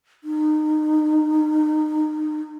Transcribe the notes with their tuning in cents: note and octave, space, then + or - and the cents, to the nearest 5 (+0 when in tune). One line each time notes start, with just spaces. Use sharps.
D#4 -25